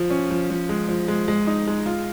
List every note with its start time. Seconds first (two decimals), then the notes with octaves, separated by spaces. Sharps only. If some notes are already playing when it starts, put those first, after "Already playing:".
Already playing: F3
0.10 C#4
0.31 F3
0.50 F3
0.69 G#3
0.89 F3
1.08 G#3
1.28 G#3
1.47 D#4
1.67 G#3
1.86 F4